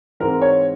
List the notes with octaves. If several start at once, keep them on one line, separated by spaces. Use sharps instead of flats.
G#2 E3 G#3 C4 A#4
C#5